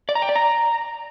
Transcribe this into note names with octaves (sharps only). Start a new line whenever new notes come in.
D5
A#5
G5
D5
A#5